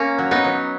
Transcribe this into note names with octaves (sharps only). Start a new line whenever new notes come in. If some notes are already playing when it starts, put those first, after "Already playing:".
Already playing: A#3 C#4
F#3
B3 D#4
F#3